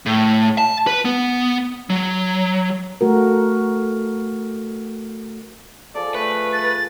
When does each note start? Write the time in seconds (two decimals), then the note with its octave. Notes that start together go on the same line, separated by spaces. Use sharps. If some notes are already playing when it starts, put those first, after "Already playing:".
0.06 A2
0.58 A5
0.87 B4
1.05 B3
1.90 F#3
3.01 A3 F#4 A#4
5.95 F3 G#4 A4 D5
6.15 A3 B4
6.53 A6